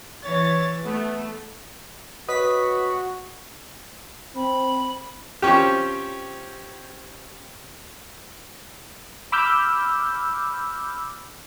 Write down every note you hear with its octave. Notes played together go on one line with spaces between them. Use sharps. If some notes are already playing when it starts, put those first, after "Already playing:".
E3 C#5 A6
A3 B3
F#4 B4 C#5 D#5 D#6 B6
C4 B5
F3 C4 C#4 G4
B5 D6 E6 F6 G6